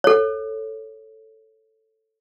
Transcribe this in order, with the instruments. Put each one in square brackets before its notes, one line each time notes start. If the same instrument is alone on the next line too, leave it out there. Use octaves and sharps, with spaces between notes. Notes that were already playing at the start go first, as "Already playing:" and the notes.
[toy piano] A4 C#5